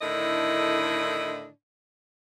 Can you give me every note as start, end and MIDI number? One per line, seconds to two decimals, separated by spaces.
0.01 1.47 45
0.01 1.47 50
0.01 1.47 51
0.01 1.47 62
0.01 1.47 64
0.01 1.47 75